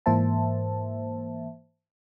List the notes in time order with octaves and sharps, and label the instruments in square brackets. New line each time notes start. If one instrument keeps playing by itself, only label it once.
[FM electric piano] G#2 E3 A#3 C5 E5 A5